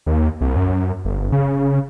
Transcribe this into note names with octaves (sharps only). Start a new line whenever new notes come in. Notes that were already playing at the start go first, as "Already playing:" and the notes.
D#2
C2
F#2
G1
C#3